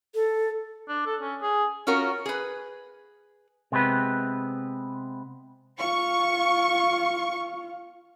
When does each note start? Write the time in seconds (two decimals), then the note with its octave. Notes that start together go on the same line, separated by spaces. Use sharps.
0.14 A4
0.89 D4
1.06 A4
1.21 C#4
1.42 G#4
1.87 C#4 F4 F#4 A#4 C#5
2.26 G#4 B4
3.72 C3 G#3 B3 C4 B4
5.79 F4 F5 C#6